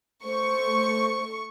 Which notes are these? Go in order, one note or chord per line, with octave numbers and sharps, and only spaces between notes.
A3 C5 C#6